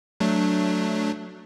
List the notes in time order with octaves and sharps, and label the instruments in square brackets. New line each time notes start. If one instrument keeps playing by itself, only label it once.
[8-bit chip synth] F#3 A3 D4